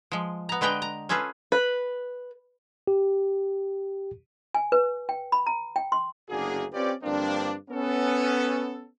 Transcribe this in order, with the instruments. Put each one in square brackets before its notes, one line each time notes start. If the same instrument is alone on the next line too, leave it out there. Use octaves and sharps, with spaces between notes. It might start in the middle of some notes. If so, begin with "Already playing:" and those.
[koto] F3 G#3
B3 A#5
D3 G#3 B4 D#5 G5 A#5
A#5
C#4 F4 G#4 A4 B4
[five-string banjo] B4
[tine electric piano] G4
[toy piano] G#5
B4
G5
B5
A#5
G5
C6
[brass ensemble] F#1 D2 A#3 D4 F#4 G#4
C4 C#4 F4 G4 B4 D5
G2 D3 F3 A#3 C4 D4
B3 C#4 A4